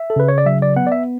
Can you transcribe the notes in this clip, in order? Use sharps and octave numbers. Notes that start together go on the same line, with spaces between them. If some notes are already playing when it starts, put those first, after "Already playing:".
Already playing: E5
A4
C#3 B4
C#5
D5
F#3 E5
D5
B3 F#5
D5
E5